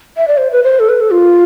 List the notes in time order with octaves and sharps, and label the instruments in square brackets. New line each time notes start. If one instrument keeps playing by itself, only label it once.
[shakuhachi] E5
D5
C5
B4
C5
A4
B4
A4
F4